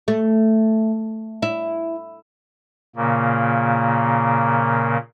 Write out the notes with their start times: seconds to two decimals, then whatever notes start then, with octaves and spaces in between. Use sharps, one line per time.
0.08 A3
1.42 E4
2.96 A#2 C#3 A#3